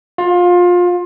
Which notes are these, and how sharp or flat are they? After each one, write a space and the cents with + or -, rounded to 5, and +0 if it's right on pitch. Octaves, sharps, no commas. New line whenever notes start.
F4 +25